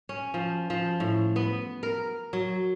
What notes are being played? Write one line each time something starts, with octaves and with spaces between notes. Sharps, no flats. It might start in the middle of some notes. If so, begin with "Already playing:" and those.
C#4
F3
F3
A2
B3
A#4
F#3